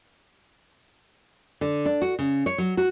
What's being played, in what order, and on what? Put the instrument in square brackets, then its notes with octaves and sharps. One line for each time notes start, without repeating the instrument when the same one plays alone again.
[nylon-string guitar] D3
D4
F#4
C#3
C#5
F#3
F#4